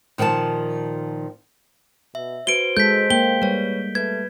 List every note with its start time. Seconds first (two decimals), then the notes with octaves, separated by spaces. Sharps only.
0.18 A#2 D#3 F3 G#4 A5
2.15 B2 E5
2.47 F#4 B4 C5 D7 G7
2.77 G#3 A4 G6 B6
3.10 A#3 G5 G7
3.42 G3 B4 C#5
3.95 A3 B4 G#6